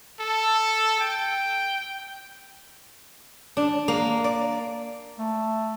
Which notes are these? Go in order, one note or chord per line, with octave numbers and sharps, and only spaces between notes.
A4
G5
D4
A#3
D5
A3